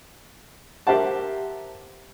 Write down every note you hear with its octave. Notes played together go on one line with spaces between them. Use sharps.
G4 A#4 C5 E5 F#5 A5